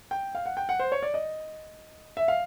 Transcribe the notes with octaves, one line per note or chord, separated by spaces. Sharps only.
G5
F5
F#5
G5
F#5
C5
C#5
D5
D#5
E5
F5